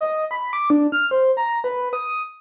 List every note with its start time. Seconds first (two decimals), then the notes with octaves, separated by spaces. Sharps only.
0.01 D#5
0.31 B5
0.53 D6
0.70 D4
0.92 F6
1.11 C5
1.37 A#5
1.64 B4
1.93 D#6